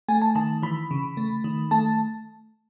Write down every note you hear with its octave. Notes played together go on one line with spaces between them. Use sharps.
A3 G#5
A5
D#3 A5
E3 B5
C#3
A3
D#3
A3 A5